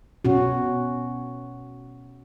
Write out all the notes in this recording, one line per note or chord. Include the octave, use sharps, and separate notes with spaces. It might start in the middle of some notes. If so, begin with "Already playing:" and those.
B2 C#4 F#4